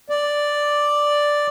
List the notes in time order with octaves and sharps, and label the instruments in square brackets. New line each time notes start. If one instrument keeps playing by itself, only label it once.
[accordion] D5